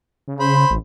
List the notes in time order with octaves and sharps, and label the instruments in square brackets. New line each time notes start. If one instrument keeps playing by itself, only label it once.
[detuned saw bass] C#3
[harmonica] C5 B5
[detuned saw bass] A1